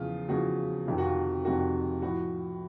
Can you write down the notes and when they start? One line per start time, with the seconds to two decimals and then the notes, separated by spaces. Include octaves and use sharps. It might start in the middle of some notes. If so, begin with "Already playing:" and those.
Already playing: E2 C#3 F3 F4
0.28 E2 C#3 F3 F#4
0.87 F2 C3 D#3
0.98 F#4
1.05 F4
1.45 F2 C3 D#3 F#4
2.02 A2 F3 F#4